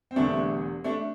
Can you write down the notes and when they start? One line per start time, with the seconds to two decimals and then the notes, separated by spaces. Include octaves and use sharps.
0.11 C4
0.16 E1 E2 D3 G3 A3 D4
0.84 A3 D4